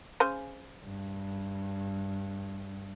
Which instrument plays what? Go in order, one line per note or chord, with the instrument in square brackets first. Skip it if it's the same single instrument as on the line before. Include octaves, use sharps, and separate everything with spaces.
[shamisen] C#3 C5 G#5
[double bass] G2